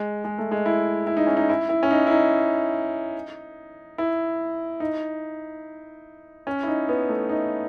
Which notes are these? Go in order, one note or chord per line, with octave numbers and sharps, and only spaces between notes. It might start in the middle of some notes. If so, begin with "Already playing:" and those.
Already playing: G#3
G#3
A3
G#3
E4
E4
D#4
C#4
D#4
E4
E4
C#4
D#4
E4
D#4
E4
D#4
C#4
E4
D#4
B3
A3
D#4